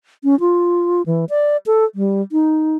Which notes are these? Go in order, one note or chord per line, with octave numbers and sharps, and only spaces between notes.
C#4
F4
E3
D5
A4
G3
D#4